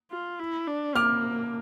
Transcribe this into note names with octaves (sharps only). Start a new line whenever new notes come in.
F4
E4
D4
A#3 D6 F6